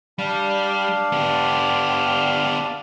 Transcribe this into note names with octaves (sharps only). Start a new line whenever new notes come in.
G3 D4 D5 F5
B3 G4